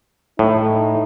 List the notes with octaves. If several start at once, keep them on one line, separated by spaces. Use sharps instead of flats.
A2 D#4